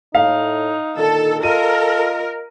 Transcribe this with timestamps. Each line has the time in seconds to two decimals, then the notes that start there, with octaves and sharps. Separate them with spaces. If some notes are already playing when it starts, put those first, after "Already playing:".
0.15 A2 D#4 F5
0.97 A#2 D3 D#3 A4
1.43 F4 A4 A#4 D#5 D#7